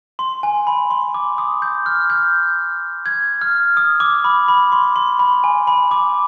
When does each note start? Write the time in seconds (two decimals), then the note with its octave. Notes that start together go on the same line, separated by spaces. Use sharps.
0.19 C6
0.43 G#5
0.67 B5
0.90 C6
1.14 D6
1.38 D#6
1.62 G6
1.86 F6
2.10 G6
3.06 G#6
3.41 F6
3.77 D#6
4.00 D6
4.24 B5
4.48 B5
4.72 C6
4.96 C6
5.19 B5
5.44 G#5
5.67 B5
5.91 D6